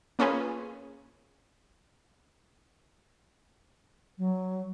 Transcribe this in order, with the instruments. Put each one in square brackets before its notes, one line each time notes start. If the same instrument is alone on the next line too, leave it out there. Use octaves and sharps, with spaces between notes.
[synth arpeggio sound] A#3 C#4 F4 G#4 B4
[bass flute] F#3